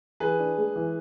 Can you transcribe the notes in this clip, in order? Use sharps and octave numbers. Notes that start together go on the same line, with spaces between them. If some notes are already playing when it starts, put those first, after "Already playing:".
E3 G#4 B4
D4
G#3
E3